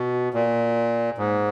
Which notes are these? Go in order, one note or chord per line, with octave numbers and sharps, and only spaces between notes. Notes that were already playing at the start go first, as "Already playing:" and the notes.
Already playing: B2
A#2
G#2